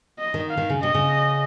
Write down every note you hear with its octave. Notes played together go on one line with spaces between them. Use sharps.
D#5
D#3
F5
D#3
C#3
C3 D#5
C#3